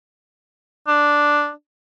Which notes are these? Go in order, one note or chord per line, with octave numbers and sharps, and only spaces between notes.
D4